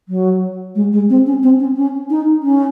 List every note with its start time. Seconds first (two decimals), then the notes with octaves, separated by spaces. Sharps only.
0.09 F#3
0.75 G#3
0.93 G#3
1.10 C4
1.26 C#4
1.43 C4
1.59 C#4
1.77 C#4
2.10 D#4
2.43 C#4